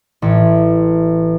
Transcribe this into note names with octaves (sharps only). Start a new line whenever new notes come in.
A1